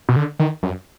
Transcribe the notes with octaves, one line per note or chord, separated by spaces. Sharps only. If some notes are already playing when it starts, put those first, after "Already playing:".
B2
D3
D#3
F#2